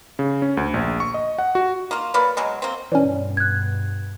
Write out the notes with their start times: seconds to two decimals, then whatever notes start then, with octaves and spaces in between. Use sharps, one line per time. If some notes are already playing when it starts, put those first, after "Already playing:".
0.19 C#3
0.42 C#4
0.57 D2
0.74 A#1
1.00 C#6
1.14 D#5
1.39 F#5
1.55 F#4
1.91 A#3 F4
2.14 F#3 A#3 B4 D5
2.37 B2 F#3 G#3
2.62 A#3 C4
2.92 G2 B2 E3 C#4 C#5 D5
3.37 F#6 G#6